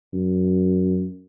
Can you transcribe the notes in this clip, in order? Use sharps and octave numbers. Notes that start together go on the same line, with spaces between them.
F#2